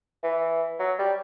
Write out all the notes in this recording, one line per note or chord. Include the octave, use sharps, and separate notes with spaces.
E3
F#3
G3